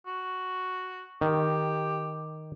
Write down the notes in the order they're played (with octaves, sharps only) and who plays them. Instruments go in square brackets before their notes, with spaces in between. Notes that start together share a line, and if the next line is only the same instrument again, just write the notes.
[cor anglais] F#4
[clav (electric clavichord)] D#3 [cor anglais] G4